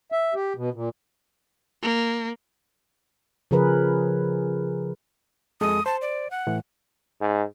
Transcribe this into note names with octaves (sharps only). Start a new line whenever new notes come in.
E5
G4
B2
A#2
A#3
C#3 F3 G#4 A#4 B4
F2 G#3 A4 D#6
C5 A5
D5
F#5
A2 E3
G#2